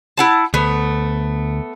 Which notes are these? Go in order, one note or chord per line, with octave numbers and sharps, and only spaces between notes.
E4 F#5 A5
D2 A3 B3